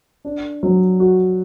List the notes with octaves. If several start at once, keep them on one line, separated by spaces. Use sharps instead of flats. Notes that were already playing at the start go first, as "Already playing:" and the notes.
D4
F#3
F#4